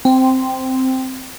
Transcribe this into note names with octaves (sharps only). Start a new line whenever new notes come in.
C4